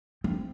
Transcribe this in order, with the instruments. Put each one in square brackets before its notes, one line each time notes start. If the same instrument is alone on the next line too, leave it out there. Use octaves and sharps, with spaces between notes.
[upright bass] C4